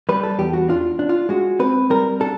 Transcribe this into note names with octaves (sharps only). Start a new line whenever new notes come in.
G3 B4
A4
E2 G4
F#4
D4 F4
D4
F4
G#3 F#4
C4 B4
G3 A#4
D4 A4